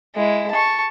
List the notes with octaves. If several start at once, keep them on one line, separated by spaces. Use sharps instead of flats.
G#3 E4
A5 C#6